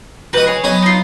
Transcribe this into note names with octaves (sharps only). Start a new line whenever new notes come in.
F#4 G4 B4 D#5 A5
G#4 C#5
F#3 B3 D#5 G#5
D#4 F4